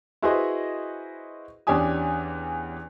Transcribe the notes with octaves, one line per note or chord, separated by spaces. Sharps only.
E4 F#4 G#4 B4 C5 D#5
E2 C#4 D4 G4 G#5 D#6